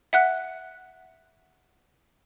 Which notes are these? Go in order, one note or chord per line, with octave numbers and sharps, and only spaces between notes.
E5 F#5 F#6